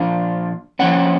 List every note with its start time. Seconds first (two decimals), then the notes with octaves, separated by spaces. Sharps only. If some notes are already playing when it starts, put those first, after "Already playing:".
Already playing: A#2 F3 A#3 D4 F5
0.79 F3 A#3 C#4 F#5